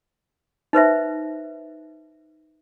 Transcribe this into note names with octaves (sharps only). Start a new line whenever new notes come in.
D#4 B4 C5 E5